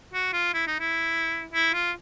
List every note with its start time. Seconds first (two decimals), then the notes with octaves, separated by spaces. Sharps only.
0.14 F#4
0.34 F4
0.54 E4
0.67 D#4
0.80 E4
1.53 E4
1.74 F4